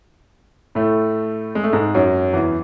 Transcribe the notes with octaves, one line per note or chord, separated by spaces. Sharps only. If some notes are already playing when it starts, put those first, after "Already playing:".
A2 A3
G#3
A3
G#2 G#3
F#2 F#3
E2 E3